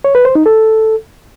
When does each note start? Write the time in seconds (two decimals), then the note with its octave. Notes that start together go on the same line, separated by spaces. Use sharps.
0.04 C#5
0.15 B4
0.25 C5
0.35 D#4
0.46 A4